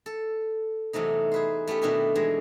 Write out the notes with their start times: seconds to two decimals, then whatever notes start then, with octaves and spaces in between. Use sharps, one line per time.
0.06 A4
0.93 E2 C3 F#3 A3 D#4
1.32 G#4 B4 C5
1.67 A3 B3 C#4 G4
1.82 B2 D#3 D4 E4 F#4 G4
2.15 E3 F#3 G#3